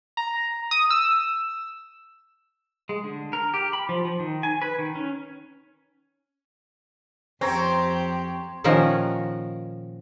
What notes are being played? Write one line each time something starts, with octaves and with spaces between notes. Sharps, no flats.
A#5
D#6
E6
G#3
D3
A#4
G4
B5
F3
F3
D#3
G#5
B4
D#3
C#4
F2 C4 G4 C#5 A#5
A#2 D#3 F3 C#4 A#4 F#5